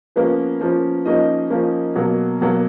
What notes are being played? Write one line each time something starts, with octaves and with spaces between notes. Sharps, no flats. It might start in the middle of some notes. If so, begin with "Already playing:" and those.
F3 A#3 B3 C#4 B4
F3 A#3 C#4
F3 A#3 C#4 D#4 D#5
F3 A#3 C#4
B2 F#3 A#3
B2 F#3 A#3